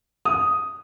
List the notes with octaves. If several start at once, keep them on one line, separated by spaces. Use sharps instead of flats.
D#6